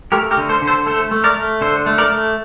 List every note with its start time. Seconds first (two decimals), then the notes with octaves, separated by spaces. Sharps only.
0.12 A3 G4 A#4
0.31 G4 A#4
0.37 D3
0.49 A4 C5
0.62 D3
0.67 A4 C5
0.86 A3 A4 C5
1.11 A3
1.24 A#4 D5
1.36 A3
1.61 D3 A4 C5
1.86 A3
1.98 A#4 D5
2.12 A3